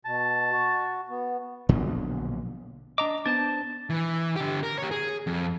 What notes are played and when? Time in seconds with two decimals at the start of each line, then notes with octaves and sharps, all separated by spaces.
0.05 B2 A5
0.52 F#4
1.09 B3
1.69 A#1 B2 D3 F#3
2.98 D4 D#5 A#5 D6
3.26 B3 D4 C5 A5 A6
3.90 E3
4.36 D3 G4
4.63 A#4
4.79 G4 C#5
4.91 G#4
5.27 F2